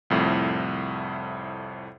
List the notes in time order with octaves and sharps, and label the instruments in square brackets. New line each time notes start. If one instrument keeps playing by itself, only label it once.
[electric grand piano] C2 F2 A2